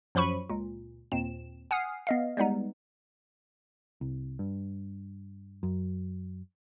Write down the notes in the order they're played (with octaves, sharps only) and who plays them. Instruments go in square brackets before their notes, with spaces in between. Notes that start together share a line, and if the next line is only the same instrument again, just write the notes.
[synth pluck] F#2 F3 F#3 B5 C#6 D#7
C#2 A#2
D#2 A#2 C4 E7
F#5 G#5 D#6 F6 C7
B3 D#5 F5
G3 G#3 B3 D#4
[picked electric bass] C2
G2
F#2